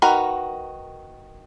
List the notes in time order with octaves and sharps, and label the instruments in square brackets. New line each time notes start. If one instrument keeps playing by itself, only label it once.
[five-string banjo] D#3 F#4 A#4 B4